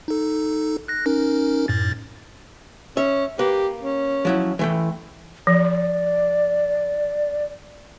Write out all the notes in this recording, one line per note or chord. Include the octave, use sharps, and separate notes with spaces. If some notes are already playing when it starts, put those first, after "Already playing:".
D#4 A4
F#6 A#6
C#4 D#4 A#4
F#2 A2 A6
C#4 E5
A#3 G4 B4
C#4
F3 F#3 E4
E3 A3 G5
F3 D5